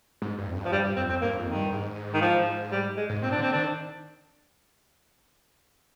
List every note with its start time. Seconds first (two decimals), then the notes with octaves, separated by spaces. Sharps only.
0.22 G#2
0.38 G2
0.47 F2
0.55 G2
0.65 F3
0.72 G2 G3
0.84 G2
0.96 F2 C4
1.09 F2 C4
1.21 G2 A#3
1.39 F2
1.47 D#3
1.55 G2
1.72 G#2
2.14 D#3
2.22 F3
2.72 G3
2.97 G#3
3.09 G#2
3.22 A#2 C4
3.32 D4
3.39 D3 C4
3.52 D#3 D4